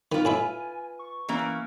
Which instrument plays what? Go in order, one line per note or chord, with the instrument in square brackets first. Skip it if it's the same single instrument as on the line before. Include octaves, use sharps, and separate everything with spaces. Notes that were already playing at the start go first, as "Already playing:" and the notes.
[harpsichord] D#3 [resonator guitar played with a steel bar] F4 B4
[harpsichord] A2 E4 E5 [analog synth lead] G#5
[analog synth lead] C#6
[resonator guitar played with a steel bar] E3 A#3 C#4